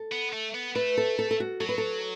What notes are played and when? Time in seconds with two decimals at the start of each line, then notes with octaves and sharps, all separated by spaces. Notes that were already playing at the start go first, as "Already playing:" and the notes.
Already playing: A4
0.12 B3
0.33 A3
0.54 B3
0.76 A3 B4
0.98 A4
1.19 A4
1.31 A4
1.40 F#4
1.60 F#3 A4
1.69 B4
1.78 A4